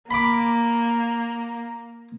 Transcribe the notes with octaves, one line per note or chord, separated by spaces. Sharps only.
A#3 B5 D6